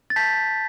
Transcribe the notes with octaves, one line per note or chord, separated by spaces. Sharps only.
A6
A5 G6 B6